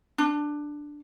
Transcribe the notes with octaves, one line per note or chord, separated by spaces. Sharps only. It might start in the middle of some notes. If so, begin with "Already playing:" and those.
D4